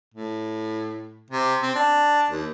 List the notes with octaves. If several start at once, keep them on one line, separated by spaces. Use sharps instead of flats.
A2
C3
C4
D4
D#2